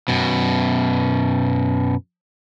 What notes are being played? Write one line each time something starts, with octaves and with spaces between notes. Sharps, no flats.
F#2 B2